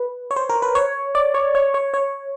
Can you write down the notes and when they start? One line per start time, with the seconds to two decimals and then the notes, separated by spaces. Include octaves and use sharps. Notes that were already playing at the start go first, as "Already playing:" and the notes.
Already playing: B4
0.31 C#5
0.36 C5
0.49 A#4
0.62 B4
0.75 C#5
1.15 D5
1.34 C#5
1.55 C#5
1.74 C#5
1.94 C#5